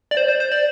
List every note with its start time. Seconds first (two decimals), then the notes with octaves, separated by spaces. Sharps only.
0.11 D5
0.17 C5
0.28 C5
0.40 C5
0.52 D5